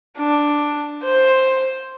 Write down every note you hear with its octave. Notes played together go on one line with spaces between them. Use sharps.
D4
C5